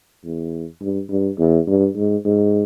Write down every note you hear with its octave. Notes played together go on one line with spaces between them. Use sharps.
E2
G2
G2
E2
G2
G#2
G#2